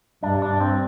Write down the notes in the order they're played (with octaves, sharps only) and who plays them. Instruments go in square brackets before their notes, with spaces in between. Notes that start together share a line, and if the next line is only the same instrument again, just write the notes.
[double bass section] G2 [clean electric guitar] D4
[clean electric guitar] D4
C4